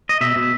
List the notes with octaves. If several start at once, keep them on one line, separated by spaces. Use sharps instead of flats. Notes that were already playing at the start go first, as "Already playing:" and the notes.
D#5
B2 E5
B2